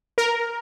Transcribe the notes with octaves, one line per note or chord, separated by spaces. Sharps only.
A#4